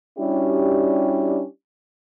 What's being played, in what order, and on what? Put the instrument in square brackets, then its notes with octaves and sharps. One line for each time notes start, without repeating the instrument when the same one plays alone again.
[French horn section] G3 C#4 D4 E4 F#4 G4